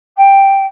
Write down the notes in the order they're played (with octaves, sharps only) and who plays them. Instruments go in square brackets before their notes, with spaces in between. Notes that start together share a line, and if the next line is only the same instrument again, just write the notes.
[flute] G5